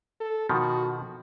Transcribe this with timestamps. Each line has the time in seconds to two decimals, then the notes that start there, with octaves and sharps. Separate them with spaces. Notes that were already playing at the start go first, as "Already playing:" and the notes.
0.21 A4
0.49 B2 D#3 F3 F#4